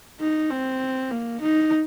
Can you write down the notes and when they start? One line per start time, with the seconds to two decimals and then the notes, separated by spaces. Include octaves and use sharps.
0.21 D#4
0.51 C4
1.11 A#3
1.41 D#4